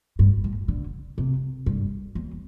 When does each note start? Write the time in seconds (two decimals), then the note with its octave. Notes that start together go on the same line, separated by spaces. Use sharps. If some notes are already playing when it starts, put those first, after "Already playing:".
0.19 G2
0.44 A2
0.68 D3
1.18 C3
1.66 G2
2.15 E2